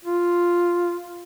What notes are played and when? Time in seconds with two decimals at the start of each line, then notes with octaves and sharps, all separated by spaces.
0.05 F4